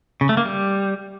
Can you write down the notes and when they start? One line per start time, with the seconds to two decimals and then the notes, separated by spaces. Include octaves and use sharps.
0.21 C#3
0.29 A3
0.37 A#3
0.45 G3